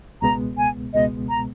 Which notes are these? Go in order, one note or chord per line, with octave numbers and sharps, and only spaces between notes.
C#2 B2 G#3 B3 A#5
G#5
C#2 B2 G#3 B3 D#5
A#5